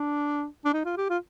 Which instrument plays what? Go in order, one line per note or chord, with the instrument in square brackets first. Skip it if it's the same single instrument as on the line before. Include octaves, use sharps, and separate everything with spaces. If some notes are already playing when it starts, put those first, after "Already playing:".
Already playing: [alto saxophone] D4
D4
D#4
F4
G4
F4